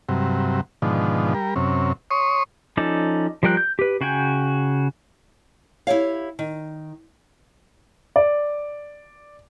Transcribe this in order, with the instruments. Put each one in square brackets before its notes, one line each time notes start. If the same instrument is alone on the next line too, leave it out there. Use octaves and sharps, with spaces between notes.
[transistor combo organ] G2 C3 F#3
G#2 B2 D3 D#3 F3
G3 A#4
F#2 C3 C#4
C#5 C6 C#6 D#6
[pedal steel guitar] F3 C#4 D#4 A4 D5
F3 G3 A#4 G5 F#6
G6
G4 B4
C#3 F#4 G5 G#5 G6
[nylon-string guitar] E4 G4 C#5 F5
D#3
[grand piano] D5